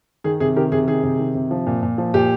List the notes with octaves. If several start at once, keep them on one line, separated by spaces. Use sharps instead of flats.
D#3 G#4
C3 G#4
D#3 G4 A#4
C3 G#4
D#3 G#4
C3
D#3
C3
F3
A#2
A#2
F3
A#2 G4